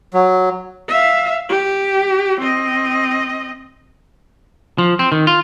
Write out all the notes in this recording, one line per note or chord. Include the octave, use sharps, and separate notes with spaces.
F#3
E5 F5
G4
C4 D#5
F3
C4
D#3
F4